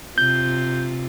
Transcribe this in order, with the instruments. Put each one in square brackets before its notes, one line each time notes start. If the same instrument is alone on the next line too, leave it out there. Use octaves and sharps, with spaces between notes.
[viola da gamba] C3 F4 [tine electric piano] G6